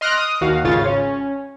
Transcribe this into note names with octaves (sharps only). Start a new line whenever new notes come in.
D#5 C6 F6 F#6 A#6 D7
D#6
D#2 F#4 F5
G#1 C#3 F4 C#5 A6
C#4